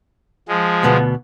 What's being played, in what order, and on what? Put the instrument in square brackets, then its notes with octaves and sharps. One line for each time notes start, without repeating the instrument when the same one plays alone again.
[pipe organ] F3 G#3
[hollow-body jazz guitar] D2 B2 B3